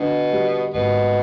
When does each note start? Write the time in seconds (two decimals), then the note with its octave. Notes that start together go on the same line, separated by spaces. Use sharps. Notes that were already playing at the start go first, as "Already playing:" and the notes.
Already playing: B2 D3
0.32 G3
0.73 G#1 B2